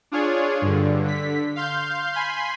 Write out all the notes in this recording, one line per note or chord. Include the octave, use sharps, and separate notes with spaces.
D4 F4 G#4 C#5
G2 D3
D3 B6
F5 C6 G6
G#5 B5 C6